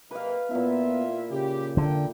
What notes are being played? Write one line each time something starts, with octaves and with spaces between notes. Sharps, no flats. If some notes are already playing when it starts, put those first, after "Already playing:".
F#2 C3 A#3 B4 F5
A#2 B3 E4 F4 E5
C#3 G4
A#2 D3 G5